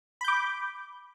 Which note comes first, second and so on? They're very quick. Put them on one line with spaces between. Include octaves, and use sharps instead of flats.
B5 G6 D6